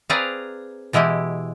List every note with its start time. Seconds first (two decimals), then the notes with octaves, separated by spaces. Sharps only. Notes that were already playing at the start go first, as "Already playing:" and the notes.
0.10 C4 G#4 B4 D5 F5 A#5
0.93 B2 E3 G#3 E4 G4